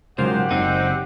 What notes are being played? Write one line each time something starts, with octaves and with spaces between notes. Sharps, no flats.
G#2 C#3 F#3 F4 G4 A#4 C5 F#5
F#1 F#3 G3 A#3 C4 D#4